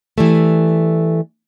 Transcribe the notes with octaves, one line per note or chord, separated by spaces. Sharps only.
E3 G3 A3